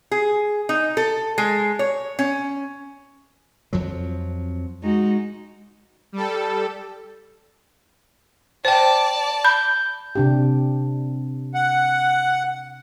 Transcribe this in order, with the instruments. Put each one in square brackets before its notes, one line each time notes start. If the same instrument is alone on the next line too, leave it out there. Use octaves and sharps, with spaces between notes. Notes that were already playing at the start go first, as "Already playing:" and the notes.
[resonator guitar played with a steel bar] G#4
D#4
A4
G#3
C#5
C#4
[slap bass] F2 F3 F#3
[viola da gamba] G#3 D#4 F#4
[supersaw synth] G3 A4
[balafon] C5 G5 [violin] D5 A5
[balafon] B5 [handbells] G6
[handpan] C3 D4 G4
[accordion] F#5